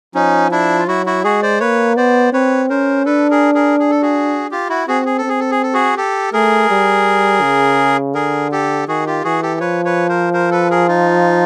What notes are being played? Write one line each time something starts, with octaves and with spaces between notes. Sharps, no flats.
F3 C#4 D#4
D4 E4
F4
F#3 E4 F#4
E4 F#4
G#3 F#4 G#4
C5 D5
A#3 B4 C#5
B3 C5 D5
C4 B4 C#5
C#4 A#4 C5
D4 A4 B4
G#4 A#4
G#4 A#4
G#4
A4
F#4 G#4
F4 G4
E4 F#4
C4 F#4 G#4
G#4
A4
C4 G#4
A4
G#4
A4
F#4 G#4
G4 A4
A3 G#4 A#4
G3
C#3
D3 G#4 A#4
G4 A4
D#3 F#4 G#4
F4 G4
E3 F#4 G#4
G4 A4
F3 B4 C#5
B4 C#5
A#4 C5
A#4 C5
A4 B4
G#4 A#4
D#4 F4